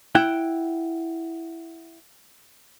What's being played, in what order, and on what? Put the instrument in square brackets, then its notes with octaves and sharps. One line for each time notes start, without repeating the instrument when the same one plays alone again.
[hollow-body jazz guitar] E4 F#5 G5